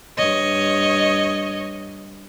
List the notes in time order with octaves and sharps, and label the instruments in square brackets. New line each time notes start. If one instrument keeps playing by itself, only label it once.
[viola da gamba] G2 C#5 D#5